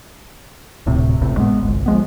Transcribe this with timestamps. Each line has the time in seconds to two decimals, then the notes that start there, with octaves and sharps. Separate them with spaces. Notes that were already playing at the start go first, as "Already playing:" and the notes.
0.86 D1 A2 C3
1.21 G#1 C#2 A2 C3
1.38 G#3 B3
1.61 G1 C2
1.86 F3 G#3 B3